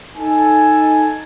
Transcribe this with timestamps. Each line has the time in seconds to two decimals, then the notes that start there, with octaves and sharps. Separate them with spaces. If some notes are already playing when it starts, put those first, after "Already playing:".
0.17 D#4 A4 G#5